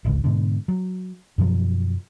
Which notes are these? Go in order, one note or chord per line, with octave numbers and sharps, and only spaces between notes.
D1 G#1 C#2
G#2 B2 D3
F#3
F#2 B2 F3 F#3